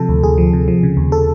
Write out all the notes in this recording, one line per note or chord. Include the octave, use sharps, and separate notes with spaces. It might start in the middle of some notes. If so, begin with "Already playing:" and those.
Already playing: C3 F3 A4
D2
D2 G#4
F3
C3
F3
C#3
D#2
A4